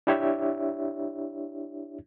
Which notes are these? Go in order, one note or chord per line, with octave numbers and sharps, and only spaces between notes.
D4 E4 G4 C#5 E5